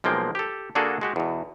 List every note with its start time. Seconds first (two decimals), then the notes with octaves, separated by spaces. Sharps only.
0.04 B1 F3 G#3 A#3 G5
0.35 G4 A4
0.75 D3 A#3 D4 F#4 G#4 A4
1.01 G#3 F#4 G4
1.16 E2 B2